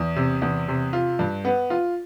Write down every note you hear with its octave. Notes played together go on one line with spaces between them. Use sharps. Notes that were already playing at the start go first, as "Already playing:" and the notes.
Already playing: E2
C3
E2
C3
F4
G2
B3
F4